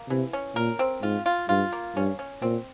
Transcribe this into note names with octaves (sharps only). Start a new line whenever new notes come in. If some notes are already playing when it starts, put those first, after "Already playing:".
Already playing: A#3
C3 E3
C#4
A#2 A#4
C4
G#2 F4
F4
G2 F4
A#3
G2 C#4
C#4
A#2 C4